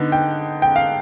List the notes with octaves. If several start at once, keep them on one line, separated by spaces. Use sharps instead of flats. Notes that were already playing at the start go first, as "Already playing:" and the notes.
Already playing: D3 B3 D#4
G5
G5
F5